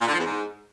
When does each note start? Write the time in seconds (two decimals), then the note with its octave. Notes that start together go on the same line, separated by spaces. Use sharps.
0.01 A#2
0.07 D3
0.13 F3
0.19 E2
0.25 G#2